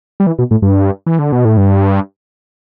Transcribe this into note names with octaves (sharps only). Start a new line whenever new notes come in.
G3
E3
B2
A2
G2
E3
D3
B2
A2
G2